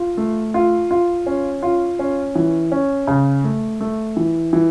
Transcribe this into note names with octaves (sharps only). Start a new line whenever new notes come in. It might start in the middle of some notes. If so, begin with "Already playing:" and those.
Already playing: F4
A3
F4
F4
C#4
F4
C#4
E3
C#4
C#3
A3
A3
E3
E3